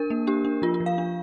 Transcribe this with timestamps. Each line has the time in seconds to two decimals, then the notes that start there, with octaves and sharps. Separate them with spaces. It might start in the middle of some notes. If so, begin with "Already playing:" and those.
Already playing: D4 A#4
0.10 A#3
0.27 D4 G4
0.45 D4
0.62 F3 F4
0.74 F4
0.80 F3
0.86 F5
0.98 D4